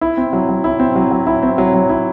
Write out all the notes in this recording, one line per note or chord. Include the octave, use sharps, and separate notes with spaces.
E4
C4
F#3
F#3
E4
C4
F#3
F#3
E4
C4
F#3
F#3
E4